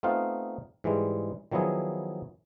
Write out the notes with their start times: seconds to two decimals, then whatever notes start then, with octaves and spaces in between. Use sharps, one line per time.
0.03 A3 B3 C4 D#4 F4 F5
0.84 G#2 E3 G3 G#3
1.51 D#3 F3 F#3 B3 E4 G#4